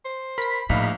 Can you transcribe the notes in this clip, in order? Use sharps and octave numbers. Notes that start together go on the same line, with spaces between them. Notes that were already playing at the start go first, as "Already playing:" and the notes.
C5
A#4 B5 B6
A#1 A2 D#4 F5